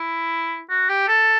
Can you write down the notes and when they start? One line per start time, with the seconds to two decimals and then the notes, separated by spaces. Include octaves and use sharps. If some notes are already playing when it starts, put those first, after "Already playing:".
Already playing: E4
0.69 F#4
0.89 G4
1.08 A4